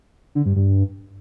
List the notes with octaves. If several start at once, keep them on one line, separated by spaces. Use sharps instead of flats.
D3
G2
G2